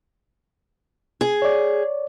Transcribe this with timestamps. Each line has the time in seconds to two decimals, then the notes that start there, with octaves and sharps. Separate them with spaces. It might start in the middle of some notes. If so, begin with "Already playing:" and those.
1.21 G#4
1.42 C#5 D5